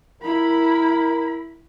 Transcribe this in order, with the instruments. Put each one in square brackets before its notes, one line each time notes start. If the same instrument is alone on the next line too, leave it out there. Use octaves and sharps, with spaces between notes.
[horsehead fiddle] E4 B5 [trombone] A#4